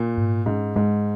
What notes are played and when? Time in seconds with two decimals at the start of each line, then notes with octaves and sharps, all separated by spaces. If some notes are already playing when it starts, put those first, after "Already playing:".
Already playing: A#2
0.17 G#2
0.46 G#2 C#4
0.76 G#2 G#3